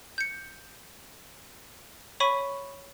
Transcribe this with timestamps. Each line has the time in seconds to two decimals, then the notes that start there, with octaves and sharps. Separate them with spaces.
0.18 G6 C#7
2.20 C#5 B5 C#6 B6 D#7